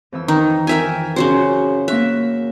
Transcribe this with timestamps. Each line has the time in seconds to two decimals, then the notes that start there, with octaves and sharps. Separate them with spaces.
0.12 F2 E3 E6
0.28 D#3 D#4
0.67 A#4 E5 G5 G#5
1.16 F#2 C#3 F#4 C5
1.88 A#3 E5 C#6 F#6